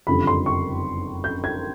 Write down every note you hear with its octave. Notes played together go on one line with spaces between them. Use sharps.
F#1 F2 D3 G3 B5
C6
C#6
G6
G#6